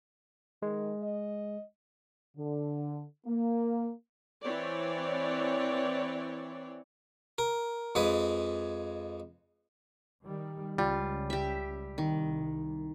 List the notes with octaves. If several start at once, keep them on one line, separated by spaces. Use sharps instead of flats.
D#3 G#3
D#5
D3
A#3
E3 C4 C#5 D5
A#4
F2 G#3 B4
D#3 G3
C#2 G3 F4
G4 E5
C2 D#3